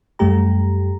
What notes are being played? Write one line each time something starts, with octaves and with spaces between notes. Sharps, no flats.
F#2 G3 A3 G4 A#5